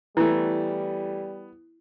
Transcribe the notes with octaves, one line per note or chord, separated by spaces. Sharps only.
E3 G3 A3 B3 E4